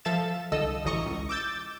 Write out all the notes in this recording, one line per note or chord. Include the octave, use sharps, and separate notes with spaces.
F3 A4 E5 F5 A6 E7
C2 D3 A4 D#5 E6
A1 D2 E3 D#5 A#5 C#6
C#2
D6 E6 G6 A6